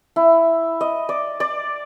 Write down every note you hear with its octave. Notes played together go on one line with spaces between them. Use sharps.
E4
D#5
D5
D5